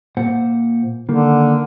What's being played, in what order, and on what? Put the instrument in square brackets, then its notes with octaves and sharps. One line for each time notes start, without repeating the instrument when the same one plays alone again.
[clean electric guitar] A#2 C5 F#5
[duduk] D3 [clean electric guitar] D#3 A#3